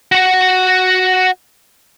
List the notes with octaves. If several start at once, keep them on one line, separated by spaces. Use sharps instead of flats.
F#4 F#5